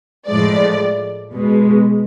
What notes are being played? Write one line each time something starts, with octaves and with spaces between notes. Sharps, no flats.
A2 F3 G#3 D5
B2 G#3